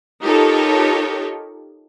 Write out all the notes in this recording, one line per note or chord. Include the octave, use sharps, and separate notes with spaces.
D#4 F4 G4 A4 A#4 C#5